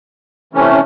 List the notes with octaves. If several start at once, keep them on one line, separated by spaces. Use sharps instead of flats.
C3 E3 A3 C#4